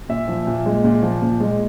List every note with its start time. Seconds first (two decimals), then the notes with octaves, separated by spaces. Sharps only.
0.09 A#2 E5
0.28 F3
0.47 A#2
0.66 G#3
0.84 A#2
1.02 F3
1.22 A#2
1.40 G#3